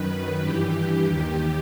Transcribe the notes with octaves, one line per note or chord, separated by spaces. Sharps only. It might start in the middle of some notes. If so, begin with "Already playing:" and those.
Already playing: F#2 D#3 B4
G2 E3 G4
D#2 D#3